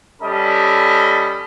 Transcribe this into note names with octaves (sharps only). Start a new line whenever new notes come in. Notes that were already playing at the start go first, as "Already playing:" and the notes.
G3 C#4 A4 D#5 B5